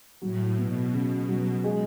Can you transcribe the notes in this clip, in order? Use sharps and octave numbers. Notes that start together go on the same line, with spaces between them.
A2 F#3
B2 B3
C#3
F#3
G#3